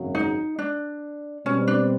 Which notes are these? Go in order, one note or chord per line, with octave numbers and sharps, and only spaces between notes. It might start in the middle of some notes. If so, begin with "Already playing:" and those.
Already playing: G#1 F#2 C#3 F#3
D#4
D4
B2 G3 C4 C#4
D4